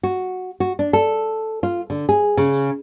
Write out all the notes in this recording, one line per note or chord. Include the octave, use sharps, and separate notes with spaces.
F#4
F#4
D4
A4
F4
D3
G#4
C#3